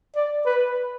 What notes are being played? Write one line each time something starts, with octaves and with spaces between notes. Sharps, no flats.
D5
B4